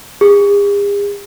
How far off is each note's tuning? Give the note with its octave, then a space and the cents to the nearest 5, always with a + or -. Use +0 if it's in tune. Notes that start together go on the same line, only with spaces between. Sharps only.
G#4 -45